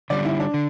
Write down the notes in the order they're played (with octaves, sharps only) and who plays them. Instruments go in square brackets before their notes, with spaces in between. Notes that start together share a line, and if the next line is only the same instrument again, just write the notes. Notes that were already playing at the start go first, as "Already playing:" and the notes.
[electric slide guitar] D3 G3 C#4 [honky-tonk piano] D5
[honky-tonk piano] E4
D4
[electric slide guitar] D3